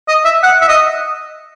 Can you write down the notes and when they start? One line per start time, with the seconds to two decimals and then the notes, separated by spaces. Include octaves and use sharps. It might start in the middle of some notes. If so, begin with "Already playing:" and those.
0.08 D#5
0.25 E5
0.43 F#5
0.61 E5
0.68 D#5